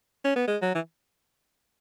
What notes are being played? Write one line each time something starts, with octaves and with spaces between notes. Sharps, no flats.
C#4
B3
G#3
F#3
E3